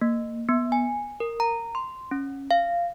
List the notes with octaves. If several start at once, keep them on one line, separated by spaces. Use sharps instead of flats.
A#3
B3
G#5
A#4
A#5
C6
C#4
F5